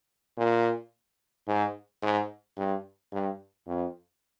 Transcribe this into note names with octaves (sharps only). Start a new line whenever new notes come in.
A#2
G#2
G#2
G2
G2
F2